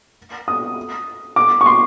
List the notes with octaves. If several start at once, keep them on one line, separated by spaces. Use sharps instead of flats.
D#6
D6
C#6
C6